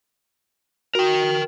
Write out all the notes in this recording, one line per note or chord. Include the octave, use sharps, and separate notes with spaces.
F#4 A#4 G5